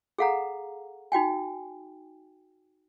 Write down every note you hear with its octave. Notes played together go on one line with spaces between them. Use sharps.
G#4 A4 F5 F#5 A#5
D#4 F#4 G5 G#5